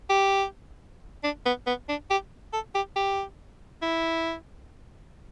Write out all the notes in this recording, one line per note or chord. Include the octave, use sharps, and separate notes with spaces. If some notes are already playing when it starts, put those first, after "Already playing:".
G4
D4
B3
B3
D4
G4
A4
G4
G4
E4